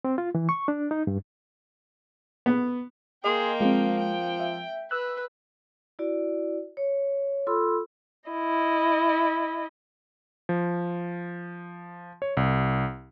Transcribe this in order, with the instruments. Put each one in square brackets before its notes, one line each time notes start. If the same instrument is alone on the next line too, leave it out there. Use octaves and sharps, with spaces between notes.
[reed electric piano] C4
F4
E3
C#6
D4
D#4
G2
[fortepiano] B3
[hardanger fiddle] A#3 G5 [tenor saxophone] G#4 [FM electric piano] D#5 C6
[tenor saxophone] F3 [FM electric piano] G#3 C4
[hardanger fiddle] G5
[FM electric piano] E5
[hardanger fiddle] B4 [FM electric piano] E6 F#6
[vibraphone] E4 F#4 D5
C#5
F4 A4 B5 C6 E6
[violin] E4 D#5
[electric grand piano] F3
C#5
C2